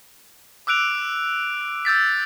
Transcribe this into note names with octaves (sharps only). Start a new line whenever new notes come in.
D6 E6 F#6 D7 F7
E6 G6 A6 B6